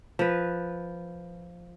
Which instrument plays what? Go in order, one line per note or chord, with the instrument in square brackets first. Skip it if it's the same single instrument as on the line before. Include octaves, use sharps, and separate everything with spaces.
[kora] F3 B4